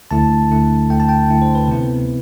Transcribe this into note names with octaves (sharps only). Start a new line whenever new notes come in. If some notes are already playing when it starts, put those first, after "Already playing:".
D2 D3 A3 E4 A5
D2 D3 A3 E4
D2 D3 A3 E4 G5
A5
G5
D2 D3 A3 E4
C5
B4
C3 F3 B3 E4